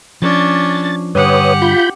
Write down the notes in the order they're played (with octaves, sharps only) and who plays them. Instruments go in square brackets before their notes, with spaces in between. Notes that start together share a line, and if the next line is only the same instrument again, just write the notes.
[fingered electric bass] F3 [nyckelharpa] C#4 D4 [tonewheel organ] A6
[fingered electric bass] G2 D3 [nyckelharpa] G4 F#5 [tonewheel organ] B4 C#5 D#6
[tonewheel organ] F4 B5 G6